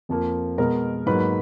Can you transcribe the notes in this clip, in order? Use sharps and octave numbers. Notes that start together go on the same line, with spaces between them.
F2 F3 A#3
B2 G#3 B3 A#4 A#5
G#2 F#3 A#3 B4 B5
B5